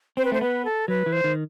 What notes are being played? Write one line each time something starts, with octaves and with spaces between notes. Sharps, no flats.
C4 C5
B4
A3 C5
B3 B4
A4
F#3 B4
E3
C5
D#3